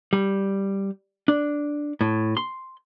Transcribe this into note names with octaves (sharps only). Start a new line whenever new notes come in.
G3
D4
A2
C6